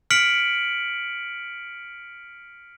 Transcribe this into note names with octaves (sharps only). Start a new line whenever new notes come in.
F6 B6 C#7 D7 F#7